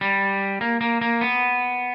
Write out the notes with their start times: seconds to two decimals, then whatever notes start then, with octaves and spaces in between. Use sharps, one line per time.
0.01 G3
0.61 A#3
0.81 A#3
1.01 A#3
1.21 B3